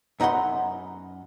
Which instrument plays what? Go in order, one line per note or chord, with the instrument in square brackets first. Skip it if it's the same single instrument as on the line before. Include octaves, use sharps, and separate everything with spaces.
[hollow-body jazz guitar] F#2 D#4 D#5 F#5 B5 C6